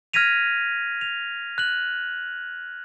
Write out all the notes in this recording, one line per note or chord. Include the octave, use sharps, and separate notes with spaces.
F6 G#6 A#6 B6 D#7 F7
F7
F#6 F#7